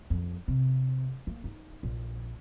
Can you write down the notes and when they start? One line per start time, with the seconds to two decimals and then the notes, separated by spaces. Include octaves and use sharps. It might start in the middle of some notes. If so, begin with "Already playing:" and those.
0.10 F2
0.48 C3
1.27 A#3
1.44 D#4
1.83 A#1